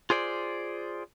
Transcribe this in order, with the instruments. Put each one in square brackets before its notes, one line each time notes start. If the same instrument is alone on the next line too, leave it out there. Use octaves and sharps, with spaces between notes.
[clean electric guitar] F4 G#4 C5 D5